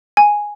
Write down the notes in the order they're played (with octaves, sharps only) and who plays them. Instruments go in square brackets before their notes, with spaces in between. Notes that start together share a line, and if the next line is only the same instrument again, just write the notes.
[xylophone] G#5